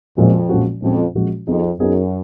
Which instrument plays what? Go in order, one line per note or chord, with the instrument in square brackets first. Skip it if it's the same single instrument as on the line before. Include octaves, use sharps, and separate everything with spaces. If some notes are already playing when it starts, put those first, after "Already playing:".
[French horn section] F2 [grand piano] A#2 F3 G#3 C#4 F#4
[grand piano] A#2 F3 G#3 C#4 F#4
[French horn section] F2 [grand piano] A#2 F3 G#3 C#4 F#4
[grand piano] A#2 F3 G#3 C#4 F#4
[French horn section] F2 [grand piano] B3 D#4 G#4
[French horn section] F#2 [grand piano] B3 D#4 G#4